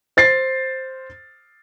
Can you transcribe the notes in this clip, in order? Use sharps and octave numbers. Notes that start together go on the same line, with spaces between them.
C5 A6 C7